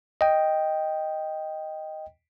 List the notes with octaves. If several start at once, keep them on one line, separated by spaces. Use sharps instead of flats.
D#5 G5